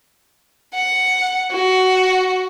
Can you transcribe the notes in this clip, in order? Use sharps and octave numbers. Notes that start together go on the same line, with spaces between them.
F#5
F#4